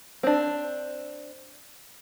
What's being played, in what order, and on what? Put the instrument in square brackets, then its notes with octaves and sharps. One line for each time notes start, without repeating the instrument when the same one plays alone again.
[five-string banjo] C4 D4